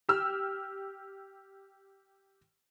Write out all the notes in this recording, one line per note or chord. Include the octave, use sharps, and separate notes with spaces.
G4 E6 F6